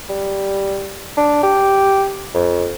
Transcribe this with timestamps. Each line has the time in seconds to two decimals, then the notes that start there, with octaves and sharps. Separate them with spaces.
0.10 G3
1.17 D4
1.43 G4
2.35 F2